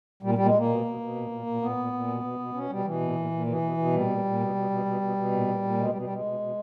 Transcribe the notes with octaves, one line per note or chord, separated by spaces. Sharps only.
A#2 G3
A#2 G3
G#3
A#2 A#3
B2
B2
B2
A#2
A#2
A#2
A#2 B3
A#2
A#2
B2
B2
B2
B2 C#4
B2 G3
B2 E3
A#2
A#2
A#2
B2 E3
B2
B2
A#2 G3
A#2
A#2
B2
B2
B2
B2
B2
B2
A#2
A#2
A#2
B2 G#3
G3
B2
G3
B2 G#3
B2
B2